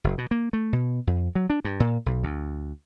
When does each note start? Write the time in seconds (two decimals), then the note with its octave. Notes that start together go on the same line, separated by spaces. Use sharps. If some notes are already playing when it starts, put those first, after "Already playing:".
0.04 F#1
0.18 B2
0.31 A#3
0.53 A3
0.73 B2
1.07 F2
1.35 F#3
1.50 D4
1.65 G2
1.80 A#2
2.06 B1
2.23 D2